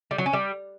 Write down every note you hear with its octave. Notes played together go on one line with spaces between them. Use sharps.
G3
F#3
C#4
G3